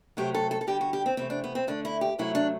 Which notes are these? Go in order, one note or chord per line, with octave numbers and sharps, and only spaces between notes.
C3 F#3 A3 G4
A4
A4
A4
D3 G3 G4
F#4
G4
C4
C3 E3 A3 C4
D4
B3
C4
D3 A3 D4
E4
G4
C3 F#3 A3 E4
D4